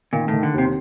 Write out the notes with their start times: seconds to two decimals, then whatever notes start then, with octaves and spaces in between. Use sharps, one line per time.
0.13 A#2 D#3
0.28 A2
0.33 D#3
0.43 D3
0.54 D#2 C3